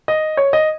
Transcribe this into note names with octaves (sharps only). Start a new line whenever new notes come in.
D#5
C#5
D#5